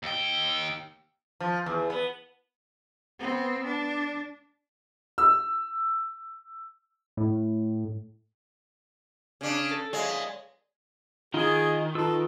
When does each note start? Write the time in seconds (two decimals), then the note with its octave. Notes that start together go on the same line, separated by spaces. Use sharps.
0.03 D#2 G5
1.40 F3
1.66 E2
1.90 B3
3.20 B3 C4
3.66 D4
5.18 E6
7.17 A2
9.41 C#3 D4
9.71 A4
9.93 G#3 C#5 D5 F5
11.34 D#3 D#4 F4 G#4
11.95 F4 A4 B4 E6